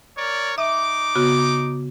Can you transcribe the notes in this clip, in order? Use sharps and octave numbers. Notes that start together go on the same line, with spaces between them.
A#4 C#5 D5
D#4 E5 D6
C#3 B3 F#4